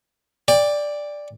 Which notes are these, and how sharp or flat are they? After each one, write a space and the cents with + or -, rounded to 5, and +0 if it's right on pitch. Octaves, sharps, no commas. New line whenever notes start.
D5 +0 G5 +35